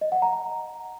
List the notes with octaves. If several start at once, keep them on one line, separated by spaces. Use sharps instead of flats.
D#5
F#5
A#5